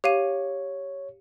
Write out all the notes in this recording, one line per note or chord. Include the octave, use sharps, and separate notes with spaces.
G4 C#5 F5 D#7